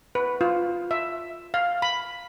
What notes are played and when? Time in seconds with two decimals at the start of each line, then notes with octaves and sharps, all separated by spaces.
0.15 B4
0.41 F4
0.91 E5
1.54 F5
1.82 B5